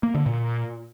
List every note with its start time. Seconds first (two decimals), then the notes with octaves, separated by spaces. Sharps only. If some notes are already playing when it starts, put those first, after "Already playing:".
0.03 A#3
0.15 D3
0.26 A#2